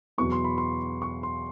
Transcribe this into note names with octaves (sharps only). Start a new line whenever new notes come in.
E2 B2 F#3 B3 C#6
C6
B5
C6
C#6
C6